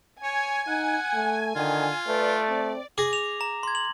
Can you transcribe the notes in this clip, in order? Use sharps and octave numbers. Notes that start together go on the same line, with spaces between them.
C#5 G#5
D#4 F#5
A3
D3 D#3 F4
A3 B4 D5
C4
G#4 D6 A#6
F7
A#5
C6 G#6
F#7